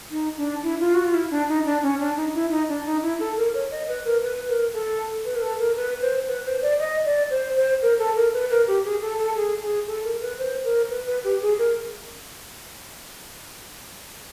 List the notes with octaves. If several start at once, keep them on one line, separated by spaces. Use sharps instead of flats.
D#4
D4
E4
F4
F#4
F4
E4
D4
D#4
D4
C#4
D4
D#4
E4
D#4
D4
D#4
E4
A4
A#4
C#5
D#5
B4
A#4
B4
A#4
A4
B4
A#4
A4
A#4
B4
C5
B4
C5
D5
D#5
D5
C5
C5
A#4
A4
A#4
B4
A#4
G4
G#4
A4
A4
G#4
G#4
A4
A#4
B4
C5
A#4
B4
B4
G4
G#4
A#4